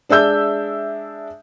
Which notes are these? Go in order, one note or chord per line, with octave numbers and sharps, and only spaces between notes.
G#3 D4 E5 E6 G6